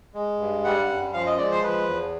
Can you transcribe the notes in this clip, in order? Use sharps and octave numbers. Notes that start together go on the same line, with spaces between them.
G#3
G2
G3 F#5
F#2
F3 F5
D#5
G#3 D5
C5
F3 B4
E2